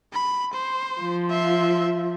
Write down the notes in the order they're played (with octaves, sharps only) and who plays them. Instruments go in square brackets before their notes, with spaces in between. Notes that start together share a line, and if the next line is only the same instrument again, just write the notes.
[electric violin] B5
C5
[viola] F3
[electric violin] E5 C6